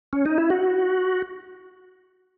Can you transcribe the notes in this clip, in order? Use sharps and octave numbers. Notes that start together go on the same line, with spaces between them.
C#4
D#4
E4
F#4